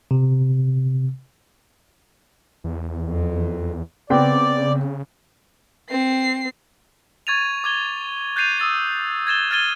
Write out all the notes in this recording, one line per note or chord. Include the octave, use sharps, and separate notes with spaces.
C3
E2
F2
C#3 B3 C4 D5 G5
C4 C7
C#6 G#6 A6 D#7 F7
D6 G#6 G7
F#6 G6 A6 C7 D#7 F7
D#6 E6 A6 D#7
G#6 A6 E7 G7
F6 G#6 A6 D#7 G7